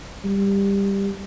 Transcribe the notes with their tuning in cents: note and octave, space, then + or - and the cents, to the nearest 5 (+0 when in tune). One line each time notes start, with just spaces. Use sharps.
G3 +15